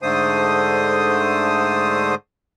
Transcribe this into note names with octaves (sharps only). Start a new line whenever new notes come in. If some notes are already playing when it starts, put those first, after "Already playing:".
G#2 D3 A3 C5 D#6